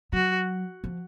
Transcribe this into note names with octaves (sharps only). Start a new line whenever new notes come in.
F#3 F#4
F3